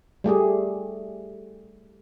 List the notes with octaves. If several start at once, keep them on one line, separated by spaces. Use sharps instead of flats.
G3 A3 G4 G#4